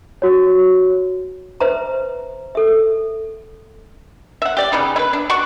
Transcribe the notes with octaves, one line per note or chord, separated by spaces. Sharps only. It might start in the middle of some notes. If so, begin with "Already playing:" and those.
F#4 C#5
B4 C5 E5 A#5
A4 E5
E5 F#5
G4 D5
C#3 E3 B3 D#4
E4 B4
D4
F#4 D5 F#5 C#6